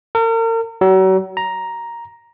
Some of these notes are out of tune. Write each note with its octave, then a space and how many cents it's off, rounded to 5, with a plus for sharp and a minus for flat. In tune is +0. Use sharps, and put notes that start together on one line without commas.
A#4 -40
F#3 +35
A#5 +5